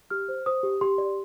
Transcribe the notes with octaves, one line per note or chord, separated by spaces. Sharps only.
G4 F6
C5
C5 D#6
G4
G4 C6
D5